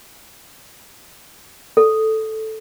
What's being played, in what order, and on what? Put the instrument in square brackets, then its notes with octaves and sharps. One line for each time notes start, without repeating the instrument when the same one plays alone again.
[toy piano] A4